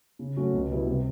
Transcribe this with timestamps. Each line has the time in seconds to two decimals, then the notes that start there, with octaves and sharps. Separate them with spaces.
0.19 C#3
0.36 F#3 A3 C#4 F#4
0.53 C#2
0.71 B2 G3 B3 E4
0.87 C3